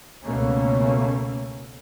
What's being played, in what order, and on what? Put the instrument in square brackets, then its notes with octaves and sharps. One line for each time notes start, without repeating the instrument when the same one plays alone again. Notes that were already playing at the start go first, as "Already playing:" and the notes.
[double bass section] C#2 B2 A3 A#3 C#4